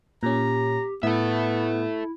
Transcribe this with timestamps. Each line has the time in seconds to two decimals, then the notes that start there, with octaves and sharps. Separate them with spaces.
0.23 A#2 C#4 G4 A#5
1.03 A2 B3 E4 A4 E5